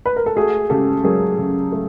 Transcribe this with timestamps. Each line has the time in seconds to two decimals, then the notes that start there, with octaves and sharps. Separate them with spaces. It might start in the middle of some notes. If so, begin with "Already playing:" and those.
0.06 B4
0.16 A#4
0.26 A4
0.36 A3 F#4 G#4
0.70 C#3 G4 A4
1.04 F#3 G#4 A#4
1.38 C#3
1.72 A3